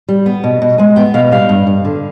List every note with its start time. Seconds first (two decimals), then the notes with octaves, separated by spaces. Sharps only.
0.09 G3
0.26 B3
0.44 B2
0.62 B2
0.78 G#3 G#5
0.96 B3 G5
1.14 B2 F5
1.31 G3 F5
1.49 G2
1.67 G2
1.85 D3